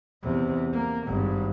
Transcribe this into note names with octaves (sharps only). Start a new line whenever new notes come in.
E2 C3
A#3
G#1 G2